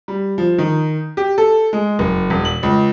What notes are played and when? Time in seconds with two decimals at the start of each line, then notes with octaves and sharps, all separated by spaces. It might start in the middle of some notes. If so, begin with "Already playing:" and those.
0.08 G3
0.38 F3
0.58 D#3
1.17 G4
1.38 A4
1.73 G#3
1.99 F#1
2.30 E1
2.45 F#7
2.63 C#2